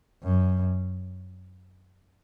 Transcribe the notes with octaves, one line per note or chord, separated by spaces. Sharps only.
F#2